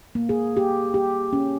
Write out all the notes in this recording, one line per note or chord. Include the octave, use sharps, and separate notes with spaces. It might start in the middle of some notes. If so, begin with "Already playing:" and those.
A#3
G#4
G4
G4
C#4